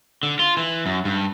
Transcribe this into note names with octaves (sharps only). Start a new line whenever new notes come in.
D3
F4
E3
F#2
G2